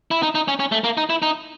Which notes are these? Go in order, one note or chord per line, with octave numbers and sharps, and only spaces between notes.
E4
D#4
D#4
C#4
C#4
A3
A#3
D#4
E4
D#4